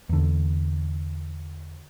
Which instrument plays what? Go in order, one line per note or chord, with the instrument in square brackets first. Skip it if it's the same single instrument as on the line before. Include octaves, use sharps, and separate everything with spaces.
[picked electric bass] E2 D3